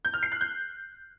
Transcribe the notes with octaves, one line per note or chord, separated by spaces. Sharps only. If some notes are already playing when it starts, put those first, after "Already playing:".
G6
F6
C7
F#6
G6